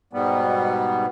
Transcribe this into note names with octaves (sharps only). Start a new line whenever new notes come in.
G#2 B2 G3 B3